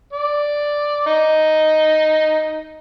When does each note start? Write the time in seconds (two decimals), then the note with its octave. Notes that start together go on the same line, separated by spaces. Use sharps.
0.13 D5
1.06 D#4